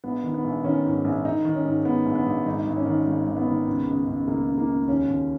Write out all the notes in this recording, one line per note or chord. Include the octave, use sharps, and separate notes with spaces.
A#1 B3
D#3
B3
A#1
D#3 C#4
G#2
A#1
D#3 D#4
D#3
C#4
G#2
G#2 B3
A#1
B3
A#1
G#1 D#4
G#1
C#4
D#3
G#1
G#1
B3
D#3
C#2
C#2
C#2
C#2 A#3
C#2
A#3
C#2
D#2 C#4
D#2